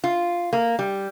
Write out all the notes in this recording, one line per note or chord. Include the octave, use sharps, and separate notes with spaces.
F4
A#3
G3